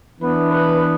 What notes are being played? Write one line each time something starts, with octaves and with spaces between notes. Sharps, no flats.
E3 B3 D4 B4
B4